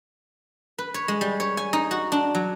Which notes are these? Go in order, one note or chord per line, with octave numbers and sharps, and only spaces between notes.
B4
C#5
G#3
G3
C#5
G#5
D#4
F#4
D4
F#3